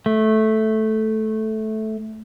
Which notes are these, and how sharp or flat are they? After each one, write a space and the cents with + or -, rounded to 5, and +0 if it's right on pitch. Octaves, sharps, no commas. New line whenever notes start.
A3 -10